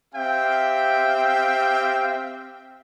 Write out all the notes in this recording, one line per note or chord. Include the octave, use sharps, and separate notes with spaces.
C4 G4 E5 F5 G5